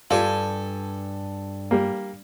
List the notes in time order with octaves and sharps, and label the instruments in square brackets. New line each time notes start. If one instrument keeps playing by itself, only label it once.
[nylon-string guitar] G2 [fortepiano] F4 G4 [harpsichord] A4 G#5
[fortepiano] G3 A#3